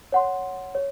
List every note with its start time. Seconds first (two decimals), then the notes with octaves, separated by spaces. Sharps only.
0.12 C#5 F#5 C6
0.75 C#5